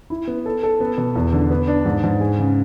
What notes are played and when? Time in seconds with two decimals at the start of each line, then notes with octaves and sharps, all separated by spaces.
0.10 E4
0.27 B3
0.46 A4
0.63 A4
0.81 B3
0.98 B2
1.16 E2
1.33 D3
1.51 B3
1.68 D4
1.85 G#2
2.03 G#2
2.21 G#4
2.38 C#3